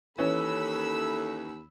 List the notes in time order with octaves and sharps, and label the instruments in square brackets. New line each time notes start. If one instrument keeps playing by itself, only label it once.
[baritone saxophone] D#2 [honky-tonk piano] E3 C#4 [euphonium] A4 [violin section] B5 E6